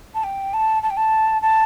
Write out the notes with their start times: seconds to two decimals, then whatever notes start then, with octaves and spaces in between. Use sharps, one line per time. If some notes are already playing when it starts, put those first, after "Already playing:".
0.14 A5
0.23 G5
0.53 A5
0.82 A5
0.89 G5
0.96 A5
1.41 A5